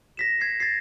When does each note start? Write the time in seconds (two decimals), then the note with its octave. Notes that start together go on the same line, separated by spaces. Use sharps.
0.17 A#6 B6 E7
0.41 G#6 C7
0.60 A6 A#6 C7